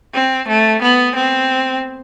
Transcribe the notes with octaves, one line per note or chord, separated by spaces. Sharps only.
C4
A3
B3
C4